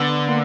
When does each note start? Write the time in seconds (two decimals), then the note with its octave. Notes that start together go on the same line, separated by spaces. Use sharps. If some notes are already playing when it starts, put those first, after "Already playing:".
Already playing: D3 B3
0.28 A#3